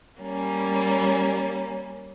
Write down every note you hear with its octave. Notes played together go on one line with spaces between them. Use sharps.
G3 A#3 C#4